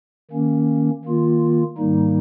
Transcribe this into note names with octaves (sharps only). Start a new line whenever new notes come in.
D#3 A#3 C#4
D#3 A#3 F4
G#2 D#3 G3 A#3 D#4